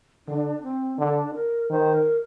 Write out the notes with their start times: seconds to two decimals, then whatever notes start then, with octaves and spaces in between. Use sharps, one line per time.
0.26 D3 D4
0.63 C4
0.98 D3 D4
1.34 A#4
1.70 D#3 C5
1.94 A#4